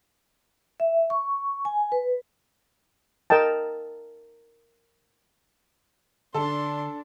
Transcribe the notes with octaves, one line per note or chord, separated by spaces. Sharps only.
E5
C#6
G#5
B4
A#4 D#5 G5 A5
D3 D4 A4 A5 C6